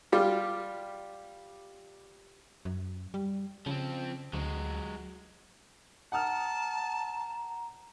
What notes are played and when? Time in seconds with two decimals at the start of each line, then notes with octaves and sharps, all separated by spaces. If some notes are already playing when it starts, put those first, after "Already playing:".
0.12 G3 F4 G4
2.65 F#2
3.14 G3
3.66 C#3 F3 C4
4.33 D2 F#3 G#3
6.12 F#5 A5 A#5 D#6 F6